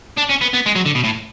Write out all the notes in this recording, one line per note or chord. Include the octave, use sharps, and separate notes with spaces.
D4
C#4
B3
B3
G#3
F#3
D3
B2
A2